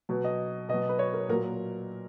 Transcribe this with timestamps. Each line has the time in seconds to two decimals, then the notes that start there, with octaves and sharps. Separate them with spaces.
0.09 B2 F#3
0.24 D#5
0.69 B2 D#5
0.74 F#3
0.89 B4
0.99 C#5
1.14 A#4
1.29 A#2 F#3 A#4